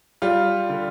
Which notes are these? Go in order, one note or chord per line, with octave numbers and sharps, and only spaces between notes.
G3 F4
D3